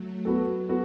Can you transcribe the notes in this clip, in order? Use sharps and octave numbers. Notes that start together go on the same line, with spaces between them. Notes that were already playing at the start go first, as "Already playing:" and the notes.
Already playing: F#3 A3
F#3 B3 F#4 A4
B3 F#4 A4